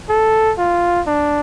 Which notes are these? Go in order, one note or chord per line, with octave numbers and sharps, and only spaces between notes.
A4
F4
D4